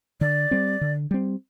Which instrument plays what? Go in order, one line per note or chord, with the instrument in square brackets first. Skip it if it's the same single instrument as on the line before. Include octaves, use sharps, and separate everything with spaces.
[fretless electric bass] D3 [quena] D5
[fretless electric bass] G3 C4
D3
G3 C4